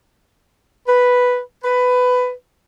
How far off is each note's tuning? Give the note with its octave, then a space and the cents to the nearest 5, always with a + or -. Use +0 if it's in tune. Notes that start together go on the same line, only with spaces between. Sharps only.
B4 +0
B4 +15